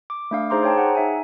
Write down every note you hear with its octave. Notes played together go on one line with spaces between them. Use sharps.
D6
A3 D4 F5
D#4 G#4 C5 A#5 C6 D6
C5 C#5 G5 A5
G#4 F#5 A#5
D#4 E5 G#5